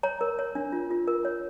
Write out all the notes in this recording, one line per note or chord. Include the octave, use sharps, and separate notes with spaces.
C#5 A#5
A#4
C#5
D4
F4
F4
A#4
C#5